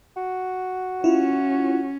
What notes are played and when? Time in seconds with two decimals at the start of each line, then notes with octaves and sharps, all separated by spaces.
0.16 F#4
1.04 C#4 E4 F4